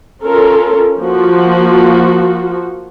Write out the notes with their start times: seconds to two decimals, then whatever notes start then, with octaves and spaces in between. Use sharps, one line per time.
0.24 C#4 F4 A4 A#4
0.99 F3 A#3 F#4